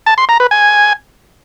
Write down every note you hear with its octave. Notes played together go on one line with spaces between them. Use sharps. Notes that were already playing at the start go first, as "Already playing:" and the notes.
A5
C6
A#5
B4
G#5